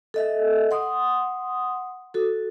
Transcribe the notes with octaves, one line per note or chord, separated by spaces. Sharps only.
A4 D#5 E5
F#5 C6 D#6
F#4 A4